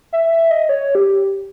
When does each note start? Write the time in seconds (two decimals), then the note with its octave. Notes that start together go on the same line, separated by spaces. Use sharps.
0.13 E5
0.32 E5
0.51 D#5
0.69 C#5
0.95 G4